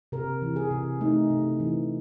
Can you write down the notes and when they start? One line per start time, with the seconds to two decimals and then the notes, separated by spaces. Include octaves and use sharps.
0.12 C3 A#4
0.42 E3
0.56 G#4
0.71 C3
1.01 A3 D#4
1.30 C3
1.60 E3